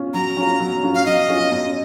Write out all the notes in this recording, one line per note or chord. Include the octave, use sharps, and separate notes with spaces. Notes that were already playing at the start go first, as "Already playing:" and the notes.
Already playing: C#4 F4
F#3 A#5
C#4 F4
F#3
C#4 F4
F5
F#3 D#5
C#4 F4
F#2